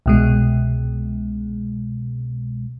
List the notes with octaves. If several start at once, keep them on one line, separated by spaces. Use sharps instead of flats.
C2 B2 G#3